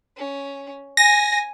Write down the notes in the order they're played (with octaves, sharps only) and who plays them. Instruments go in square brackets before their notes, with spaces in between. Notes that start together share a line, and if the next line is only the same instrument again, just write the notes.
[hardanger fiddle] C#4
[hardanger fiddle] G#5 [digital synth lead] A#6